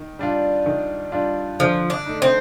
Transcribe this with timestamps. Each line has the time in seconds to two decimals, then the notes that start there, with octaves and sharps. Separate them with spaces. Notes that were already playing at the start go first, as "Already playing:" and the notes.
Already playing: D#3
0.19 G3 D4 F4
0.66 D#3
1.12 G3 D4 F4
1.60 D3 F3
1.90 D4
2.06 A3 D#4
2.22 C4